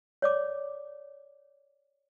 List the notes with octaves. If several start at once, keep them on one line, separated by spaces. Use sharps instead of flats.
C#5 D5 D6